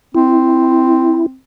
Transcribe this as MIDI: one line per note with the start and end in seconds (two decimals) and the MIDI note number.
0.15 1.37 60
0.15 1.26 64